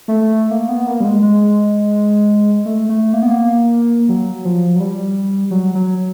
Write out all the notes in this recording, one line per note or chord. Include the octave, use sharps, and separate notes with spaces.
A3
A#3
B3
A#3
G3
G#3
G#3
A3
A3
A#3
B3
A#3
F#3
F3
F#3
G3
F#3
F#3